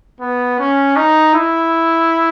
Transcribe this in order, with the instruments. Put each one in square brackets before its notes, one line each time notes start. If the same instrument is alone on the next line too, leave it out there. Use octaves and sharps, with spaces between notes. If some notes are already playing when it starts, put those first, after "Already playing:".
[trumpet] B3
C#4
D#4
E4